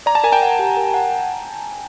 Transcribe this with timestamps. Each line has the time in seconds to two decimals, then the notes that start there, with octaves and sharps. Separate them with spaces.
0.06 D5 A#5
0.15 A5
0.24 A#4 G#5
0.32 G5 A5
0.42 F#5
0.59 G4
0.77 A#4
0.94 F#5